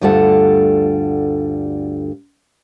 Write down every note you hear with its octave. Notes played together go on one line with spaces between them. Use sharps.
D2 G2 G3 F4 A4 F#5